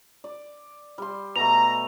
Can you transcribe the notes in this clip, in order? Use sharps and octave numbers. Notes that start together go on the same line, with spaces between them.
D5
G3 C6
B2 A3 A#5 F7